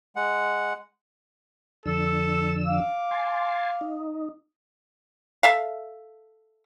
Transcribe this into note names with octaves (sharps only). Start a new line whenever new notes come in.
G#3 F#5
F2 D3 A4 E6
F5 D6
G#5 A5 C6
D#4
A4 E5 F5